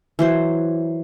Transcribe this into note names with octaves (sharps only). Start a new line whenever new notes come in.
E3 F#3 C5